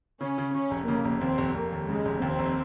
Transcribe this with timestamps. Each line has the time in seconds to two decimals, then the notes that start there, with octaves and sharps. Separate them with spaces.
0.21 C#3 C#4
0.38 C#3
0.54 C#3 C#4
0.71 F1
0.87 C#3 A#3
1.05 F1
1.21 D#2 C4
1.38 F1
1.55 F1 A#3
1.72 D#2
1.88 C#3 G#3
2.05 F1
2.22 D#2 C4
2.39 F1